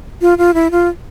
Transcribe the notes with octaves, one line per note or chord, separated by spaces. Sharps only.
F4
F4
E4
F4